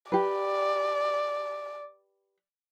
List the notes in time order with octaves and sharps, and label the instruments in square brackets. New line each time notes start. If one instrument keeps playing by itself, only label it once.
[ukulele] G4 B4 [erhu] D5